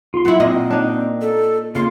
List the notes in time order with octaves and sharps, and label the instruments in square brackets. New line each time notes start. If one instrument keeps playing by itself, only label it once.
[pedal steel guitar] F4 C6
[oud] F#3 E4 [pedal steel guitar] A#3 F#5 [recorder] F4
[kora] A#2 [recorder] C4 [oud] D#5
[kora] D4 D#4
[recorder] A4
[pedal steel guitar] C#3 C6 [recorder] A#3 [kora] F4